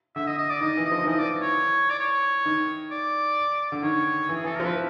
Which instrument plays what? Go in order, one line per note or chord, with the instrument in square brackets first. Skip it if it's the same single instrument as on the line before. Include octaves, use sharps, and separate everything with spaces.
[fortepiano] D3 [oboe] E5
[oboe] D#5
D#5
D5
[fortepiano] D#3 [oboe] D#5
[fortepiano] E3
[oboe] D#5
[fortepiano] F3
D#3
[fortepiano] E3 [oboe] D#5
[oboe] D5
C#5
D5
C#5
[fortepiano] D#3
[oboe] D5
[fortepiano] D3
[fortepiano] D#3 [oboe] C#5
[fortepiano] E3
[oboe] G#4
[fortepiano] E3 [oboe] A4
[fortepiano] F3 [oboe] A#4
[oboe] B4